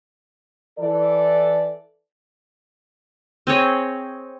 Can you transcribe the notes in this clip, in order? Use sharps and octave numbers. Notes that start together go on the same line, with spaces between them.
E3 A4 D5
C4 G#4 C#5 D#5